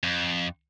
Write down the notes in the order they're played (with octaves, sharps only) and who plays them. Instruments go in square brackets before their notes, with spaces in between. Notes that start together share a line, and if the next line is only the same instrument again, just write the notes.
[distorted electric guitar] F2